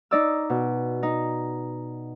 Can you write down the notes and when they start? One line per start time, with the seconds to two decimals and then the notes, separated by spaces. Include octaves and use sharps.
0.11 D#4 D5 E6
0.50 B2
1.03 D#4